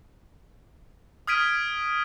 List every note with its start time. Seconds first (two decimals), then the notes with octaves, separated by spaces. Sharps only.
1.27 D#6 F6 G#6 B6 D7 D#7